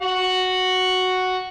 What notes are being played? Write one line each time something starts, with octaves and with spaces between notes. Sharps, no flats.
F#4 F#5